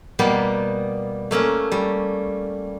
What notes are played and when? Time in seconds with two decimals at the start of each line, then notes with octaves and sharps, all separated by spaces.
0.19 B2 G3 A#3 B3 G4
1.31 A3 A#3 C#4 A#4
1.72 G3